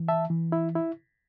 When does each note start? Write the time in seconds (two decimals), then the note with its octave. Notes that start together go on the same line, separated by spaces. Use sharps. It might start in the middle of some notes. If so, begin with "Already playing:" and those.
Already playing: E3
0.08 E5 A5
0.30 E3
0.52 E4
0.75 E4